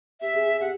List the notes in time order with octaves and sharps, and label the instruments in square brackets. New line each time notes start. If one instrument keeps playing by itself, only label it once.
[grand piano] G4 [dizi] E5
[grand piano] G#4
G#4
[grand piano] G4 [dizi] F#5